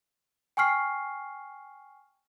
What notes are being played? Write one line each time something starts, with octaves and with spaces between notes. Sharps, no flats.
G5 G#5 C#6 F6 C7